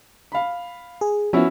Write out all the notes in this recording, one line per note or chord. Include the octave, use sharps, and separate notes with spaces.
F5 B5
G#4
F3 B3 C#4 E4 F#4